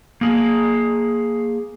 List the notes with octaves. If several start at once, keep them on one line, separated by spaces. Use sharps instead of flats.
A#3 G#4